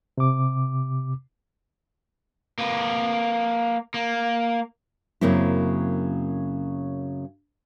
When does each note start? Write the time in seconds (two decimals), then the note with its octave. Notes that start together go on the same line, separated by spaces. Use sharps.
0.18 C3 D6
2.58 A#3 B4
3.94 A#3
5.21 F#2 C#3 F#3 A#3 C4 E4